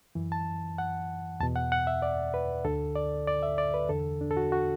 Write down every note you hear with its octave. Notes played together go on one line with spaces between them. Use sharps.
F#2 E3
A5
F#5
E2 B2 A5
F#5
F#5
E5
D5
B4
D2 D3 A4
D5
D5
E5
D5
B4
E2 D3 A4
D4
A4
F#4
F#4